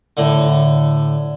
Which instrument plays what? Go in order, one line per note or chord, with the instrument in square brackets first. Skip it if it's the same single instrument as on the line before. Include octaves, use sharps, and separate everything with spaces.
[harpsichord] A2 D3